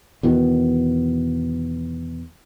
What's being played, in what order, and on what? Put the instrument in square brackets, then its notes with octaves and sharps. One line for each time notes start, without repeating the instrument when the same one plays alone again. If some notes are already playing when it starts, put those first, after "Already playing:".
[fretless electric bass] E2 B2 D#3